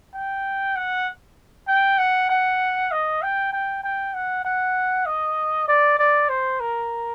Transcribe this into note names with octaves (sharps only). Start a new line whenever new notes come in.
G5
F#5
G5
F#5
F#5
D#5
G5
G5
G5
F#5
F#5
D#5
D5
D5
C5
A#4